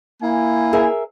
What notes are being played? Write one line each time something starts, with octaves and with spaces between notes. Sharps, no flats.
A#3 E4 G#5
G#4 A#4 E5